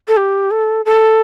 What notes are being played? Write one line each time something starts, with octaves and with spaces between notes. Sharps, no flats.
A4
G4
A4
A4